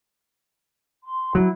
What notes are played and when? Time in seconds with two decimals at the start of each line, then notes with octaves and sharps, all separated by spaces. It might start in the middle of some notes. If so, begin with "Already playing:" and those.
1.04 C6
1.35 F#3 E4